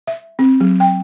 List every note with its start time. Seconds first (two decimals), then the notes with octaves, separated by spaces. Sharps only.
0.07 E5
0.39 C4
0.61 F#3
0.80 G5